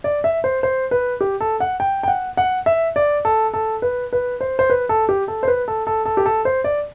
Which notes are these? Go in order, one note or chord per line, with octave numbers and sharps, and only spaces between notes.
D5
E5
C5
C5
B4
G4
A4
F#5
G5
G5
F#5
F#5
E5
D5
A4
A4
B4
B4
C5
C5
B4
A4
G4
A4
C5
B4
A4
A4
A4
G4
A4
C5
D5